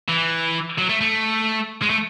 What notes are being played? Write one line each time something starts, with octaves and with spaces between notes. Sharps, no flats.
E3
F#3
A3
A3
G#3
A3